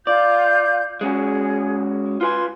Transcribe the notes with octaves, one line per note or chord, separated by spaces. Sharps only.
F4 D5 F5 G6
G#3 C#4 F#4 G#4
F4 B4 G#5 C6